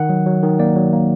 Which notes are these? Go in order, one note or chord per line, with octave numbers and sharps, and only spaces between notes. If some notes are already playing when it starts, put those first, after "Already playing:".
Already playing: D#3 F#5
F#3
F#3
D#3
A#3 D5
F#3
A#3